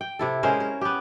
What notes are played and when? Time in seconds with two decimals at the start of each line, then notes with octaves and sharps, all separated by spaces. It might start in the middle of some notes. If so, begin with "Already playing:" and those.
0.01 G5
0.19 C3 E4 A4
0.43 G#3 C#4 A#4 C5
0.60 A#4
0.81 B3 G4